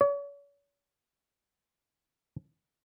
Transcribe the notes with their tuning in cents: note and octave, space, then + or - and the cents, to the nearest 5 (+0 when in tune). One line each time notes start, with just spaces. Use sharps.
C#5 +40